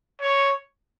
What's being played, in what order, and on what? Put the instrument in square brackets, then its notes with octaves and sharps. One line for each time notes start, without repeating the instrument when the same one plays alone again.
[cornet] C#5